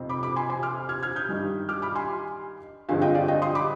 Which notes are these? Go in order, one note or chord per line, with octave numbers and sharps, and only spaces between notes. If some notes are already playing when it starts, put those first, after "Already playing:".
Already playing: F2 C3 F3 C4 D#4
B5 D6
B5 D6
G#5 C6
G#5 C6
D6 F6
F6 G#6
F6 G#6
D#6 G6
G2 D#3 G3
D6 F6
B5 D6
G#5 C6
G2 D3 F3 G#3 C4 F5 G#5
D#5 G5
D5 F5
D#5 G5
C6 D#6
B5 D6